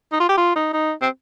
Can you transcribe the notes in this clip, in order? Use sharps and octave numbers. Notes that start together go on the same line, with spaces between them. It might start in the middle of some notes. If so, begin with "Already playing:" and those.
D#4
F4
G4
F4
D#4
D#4
C4